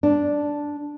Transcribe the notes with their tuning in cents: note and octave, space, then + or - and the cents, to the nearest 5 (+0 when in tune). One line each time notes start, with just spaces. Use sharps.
D4 -5